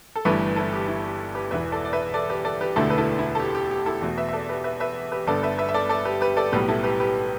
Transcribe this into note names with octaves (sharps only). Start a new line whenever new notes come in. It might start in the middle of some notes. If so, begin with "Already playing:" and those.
A4
G1 G2 E3 A3 G4 B4
E4 A4
G4
E4
G4
G4 B4
E1 E2 E3 B4 E5
A4 D5
D5
B4 E5
A4 D5
G4 B4
A4 D5
G4 B4
E1 D2 D3 A3 E4 A4
B4
E4 A4
E4
A4
G4
G4
G4
E4 A4
E2 B2 A3
B4 E5
E5
A4 D5
G4 B4
B4 E5
B4 E5
G4 B4
G1 G2 D3 B3 A4 D5
B4 E5
B4 E5
E5
A4 D5
A4 D5
G4 B4
G4 B4
A4 D5
B1 A2 G3 B3 G4 B4
E4 A4
G4 B4
G4 B4